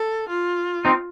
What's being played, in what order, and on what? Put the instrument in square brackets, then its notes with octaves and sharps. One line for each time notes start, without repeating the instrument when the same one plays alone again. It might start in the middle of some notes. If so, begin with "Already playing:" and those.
Already playing: [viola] A4
F4
[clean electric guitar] C4 D#4